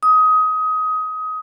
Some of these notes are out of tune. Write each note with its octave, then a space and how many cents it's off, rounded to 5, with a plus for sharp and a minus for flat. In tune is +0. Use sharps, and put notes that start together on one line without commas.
D#6 +20